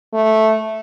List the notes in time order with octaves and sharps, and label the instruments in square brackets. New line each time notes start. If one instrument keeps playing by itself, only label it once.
[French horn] A3